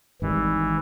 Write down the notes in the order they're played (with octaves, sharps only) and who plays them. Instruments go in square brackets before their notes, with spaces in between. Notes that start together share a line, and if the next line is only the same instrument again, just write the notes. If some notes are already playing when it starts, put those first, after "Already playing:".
[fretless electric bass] G#1 D#3 G3 [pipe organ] E3